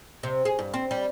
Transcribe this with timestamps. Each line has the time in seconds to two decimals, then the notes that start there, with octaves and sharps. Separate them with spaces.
0.23 C3
0.45 G#4
0.59 G2
0.74 C4
0.91 G3